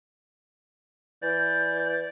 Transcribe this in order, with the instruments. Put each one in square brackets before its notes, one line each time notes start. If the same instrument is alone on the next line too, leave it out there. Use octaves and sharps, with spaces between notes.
[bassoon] E3 [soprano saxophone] D5 [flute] G6